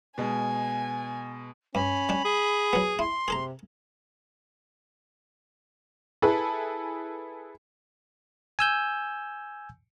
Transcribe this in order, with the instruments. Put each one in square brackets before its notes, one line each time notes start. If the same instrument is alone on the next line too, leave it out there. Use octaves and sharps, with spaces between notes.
[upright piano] B2 G#3 [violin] G#5
[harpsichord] G2 [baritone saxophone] C#4 [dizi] B5
[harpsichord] G3 D4
[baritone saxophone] G#4
[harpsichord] F#3 B3
[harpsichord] E4 [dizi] C6
[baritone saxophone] C3 [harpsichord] G#4 A4 A#5
[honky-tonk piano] E4 G#4 A4 B4
[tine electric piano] G#5 E6 G6